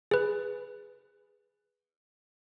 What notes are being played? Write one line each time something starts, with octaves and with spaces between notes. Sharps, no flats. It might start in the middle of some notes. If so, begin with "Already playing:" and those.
G#4 B4